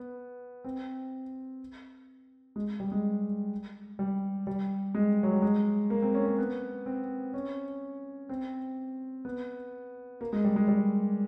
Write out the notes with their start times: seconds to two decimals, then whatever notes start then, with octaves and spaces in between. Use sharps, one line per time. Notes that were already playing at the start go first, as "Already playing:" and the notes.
Already playing: B3
0.64 C4
2.56 G#3
2.80 G3
2.92 G#3
3.99 G3
4.47 G3
4.94 G#3
5.23 F#3
5.33 G3
5.42 G#3
5.90 A#3
6.02 C4
6.15 C#4
6.26 C#4
6.38 B3
6.86 C4
7.34 C#4
8.29 C4
9.25 B3
10.21 A#3
10.33 G#3
10.45 G3
10.56 G#3
10.68 G3